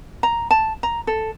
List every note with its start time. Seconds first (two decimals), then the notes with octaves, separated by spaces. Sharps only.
0.23 A#5
0.51 A5
0.83 A#5
1.07 A4